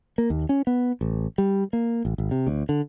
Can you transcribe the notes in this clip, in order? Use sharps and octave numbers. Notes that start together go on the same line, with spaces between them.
A#3
D#2
C#4
B3
A1
G3
A#3
A1
G#1
C3
D2
D3